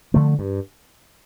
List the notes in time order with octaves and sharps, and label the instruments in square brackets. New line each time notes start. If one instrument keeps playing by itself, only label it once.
[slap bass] D3 F3 A3
G2